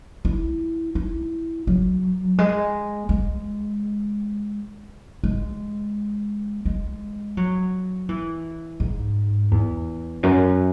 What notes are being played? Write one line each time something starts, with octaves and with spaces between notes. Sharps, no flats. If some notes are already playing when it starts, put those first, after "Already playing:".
E4
E4
F#3
G#3
G#3
G#3
G#3
F#3
E3
G#2
E2
F#2